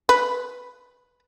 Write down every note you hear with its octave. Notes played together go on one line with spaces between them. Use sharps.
B4